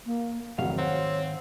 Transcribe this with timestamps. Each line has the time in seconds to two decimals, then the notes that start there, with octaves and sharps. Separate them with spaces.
0.06 A#3
0.58 F1 G#2 D#3 F#3 F5 F#5
0.78 C4 C#5 F#5